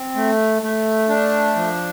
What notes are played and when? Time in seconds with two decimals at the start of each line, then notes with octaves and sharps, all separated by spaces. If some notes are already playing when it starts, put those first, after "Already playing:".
Already playing: C4
0.16 A3
0.63 A3
1.09 D4
1.56 F3